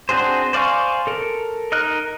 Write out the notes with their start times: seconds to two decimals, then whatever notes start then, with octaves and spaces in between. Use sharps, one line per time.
0.09 C4 D4 F#4 G#4 C5
0.53 C5 D5 F5 G#5 C#6
1.07 A4 A#4
1.72 D#4 A#4 D#5 F6 F#6